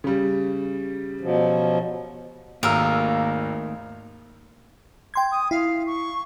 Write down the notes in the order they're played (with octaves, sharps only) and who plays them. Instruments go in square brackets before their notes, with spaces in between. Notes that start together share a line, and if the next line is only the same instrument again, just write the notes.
[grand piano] C#3 G3
[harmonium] B2 F3 F#3
[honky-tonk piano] G#1 E6 [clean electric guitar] D#2 A3 G#4 [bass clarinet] A#3 [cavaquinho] A#4
[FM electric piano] G5 C6 G#6
[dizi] D#6
[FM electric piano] E4 [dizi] F5
[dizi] C#6